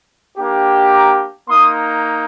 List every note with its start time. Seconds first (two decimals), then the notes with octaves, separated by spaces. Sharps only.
0.38 A#3 D4 G4
0.93 A#5 D6
1.49 A#3 D#4 C6 D#6